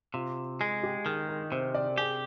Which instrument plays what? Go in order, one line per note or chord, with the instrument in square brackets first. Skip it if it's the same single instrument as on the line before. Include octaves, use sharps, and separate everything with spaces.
[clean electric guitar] C3 [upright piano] F4
[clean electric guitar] G#3 [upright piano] G#4
[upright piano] G4
[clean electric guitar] D#3 [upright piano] G#4
[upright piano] A#4
[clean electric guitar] C3 [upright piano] C5
[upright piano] D5
[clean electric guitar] G4 [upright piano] G#4